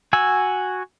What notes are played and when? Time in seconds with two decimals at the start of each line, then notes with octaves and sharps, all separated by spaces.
0.13 F#4 G#5 E6